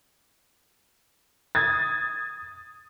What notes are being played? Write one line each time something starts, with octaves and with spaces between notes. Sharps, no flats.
D#6 G#6 A6